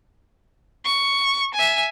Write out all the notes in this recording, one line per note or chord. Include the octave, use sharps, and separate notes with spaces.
C#6
E5 G#5